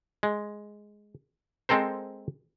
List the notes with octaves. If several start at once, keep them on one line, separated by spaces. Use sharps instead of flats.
G#3
G#3 C4 A4 A#4 C5